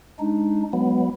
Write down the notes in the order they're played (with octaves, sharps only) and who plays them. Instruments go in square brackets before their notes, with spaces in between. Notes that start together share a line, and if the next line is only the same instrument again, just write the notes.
[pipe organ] G#3 D4 D#4
[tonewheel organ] F#3 B3 [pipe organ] G#3